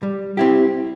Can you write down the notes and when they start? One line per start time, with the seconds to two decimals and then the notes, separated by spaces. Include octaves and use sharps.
0.03 G3
0.37 C4 E4 G4